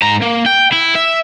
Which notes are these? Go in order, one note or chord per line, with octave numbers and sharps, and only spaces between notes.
G#2 A#5
A#3
G5
E4
E5